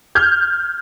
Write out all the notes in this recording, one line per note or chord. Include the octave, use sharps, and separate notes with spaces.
F6 G6 G#6